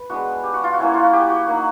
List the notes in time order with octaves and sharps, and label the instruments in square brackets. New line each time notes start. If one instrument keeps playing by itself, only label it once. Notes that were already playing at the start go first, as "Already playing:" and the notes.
Already playing: [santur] B4
G#3 B3 D4 F#4
G4
F#4
F4
F#4
A#3 C#4 E4
F4
F#4
G4
F#4
F#3 A#3 D#4 F#4